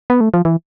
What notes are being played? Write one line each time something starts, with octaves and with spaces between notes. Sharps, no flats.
B3
A3
F3
E3